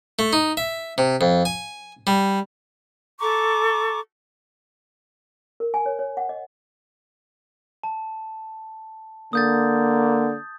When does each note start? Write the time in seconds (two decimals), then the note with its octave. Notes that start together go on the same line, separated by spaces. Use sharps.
0.19 A3
0.33 D#4
0.57 E5
0.98 C3
1.21 F2
1.45 G#5
2.07 G3
3.20 A4 A#5 C#6 D6
5.60 A#4
5.74 G#5
5.86 C#5
5.99 C#5
6.17 F#5
6.29 D#5
7.83 A5
9.33 D3 A#3 D#6 G6 A6